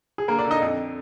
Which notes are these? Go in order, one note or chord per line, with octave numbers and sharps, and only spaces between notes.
G#4
D3 A#3 A#4
D4 D5
D3
D#4 D#5
F2